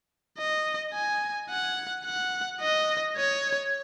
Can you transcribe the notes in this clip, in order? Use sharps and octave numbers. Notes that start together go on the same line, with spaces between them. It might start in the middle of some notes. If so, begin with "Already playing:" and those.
D#5
G#5
F#5
F#5
D#5
C#5